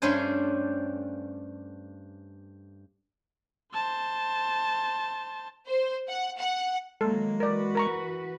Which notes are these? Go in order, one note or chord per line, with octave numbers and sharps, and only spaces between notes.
G2 A3 C#4 D4 C5 G#5
C5 A5
C5
F#5
F#5
D#3 F#3 G#3 A#3 A4
E3 F#4 A#4 B4 D5
A#4 A#5 C#6